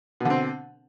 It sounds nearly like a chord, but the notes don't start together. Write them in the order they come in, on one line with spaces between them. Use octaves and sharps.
B2 D3 C4